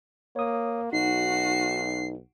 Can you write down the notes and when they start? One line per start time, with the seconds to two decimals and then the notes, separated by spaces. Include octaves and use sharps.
0.36 A#3 C#5 D#6
0.93 B1 D#4 F#4 C7